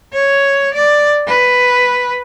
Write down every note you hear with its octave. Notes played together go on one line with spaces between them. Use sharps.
C#5
D5
B4